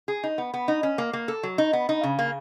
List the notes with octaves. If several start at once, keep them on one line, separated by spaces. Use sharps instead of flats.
G#4
D#4
B3
B3
D#4
C#4
A#3
A#3
A4
F#3
D#4
B3
D#4
C#3
A#3